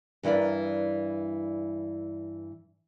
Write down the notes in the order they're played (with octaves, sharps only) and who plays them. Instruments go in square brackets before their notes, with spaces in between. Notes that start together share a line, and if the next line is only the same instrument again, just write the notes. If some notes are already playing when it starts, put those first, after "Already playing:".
[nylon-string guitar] G2 E3 E4 A#4 D5